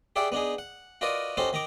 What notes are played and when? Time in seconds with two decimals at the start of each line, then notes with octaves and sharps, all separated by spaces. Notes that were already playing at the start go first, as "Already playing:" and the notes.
0.16 G4 G#4 D5 E5 F#5 G5
0.32 B3 D4 D#4 G#4
0.58 F#5
1.01 F4 F#4 A#4 B4 D5 D#5
1.37 C#4 D#4 F#4 G4 A4 C5
1.53 D#3 D#4 A#5 D6